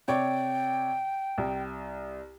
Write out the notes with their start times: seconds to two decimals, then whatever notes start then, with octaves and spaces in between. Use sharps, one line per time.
0.08 C3 C#5 D5 G5
1.38 C2